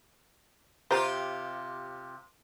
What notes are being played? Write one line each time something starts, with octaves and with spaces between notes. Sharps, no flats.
C3 F4 G4 C5 A#5